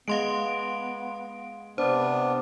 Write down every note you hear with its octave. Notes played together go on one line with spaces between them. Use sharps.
G#3 B3 F5 C6 D7
C3 B3 D4 C5